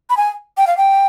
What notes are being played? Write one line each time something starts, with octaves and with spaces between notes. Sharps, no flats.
B5
G#5
G5
F5
G5